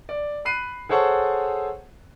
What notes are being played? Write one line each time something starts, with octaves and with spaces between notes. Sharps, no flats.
D5
B5 F#6 C7 D#7
G#4 A4 C5 C#5 F#5 A5